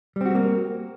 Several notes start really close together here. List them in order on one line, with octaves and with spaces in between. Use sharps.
G3 C4 F#4 G#3 A#3